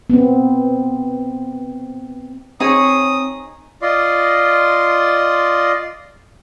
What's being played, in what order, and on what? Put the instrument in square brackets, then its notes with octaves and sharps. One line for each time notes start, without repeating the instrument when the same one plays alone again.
[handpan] B3 C4
[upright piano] C4 [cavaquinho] D#4 G#4 C#5 [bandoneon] D#6
[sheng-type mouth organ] F4 D5 D#5 C6